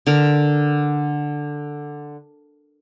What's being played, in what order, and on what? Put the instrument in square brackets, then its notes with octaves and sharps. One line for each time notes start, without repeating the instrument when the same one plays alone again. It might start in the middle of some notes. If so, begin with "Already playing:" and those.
[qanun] D3 A#4